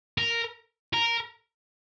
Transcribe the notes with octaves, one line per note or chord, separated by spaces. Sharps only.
A#4
A#4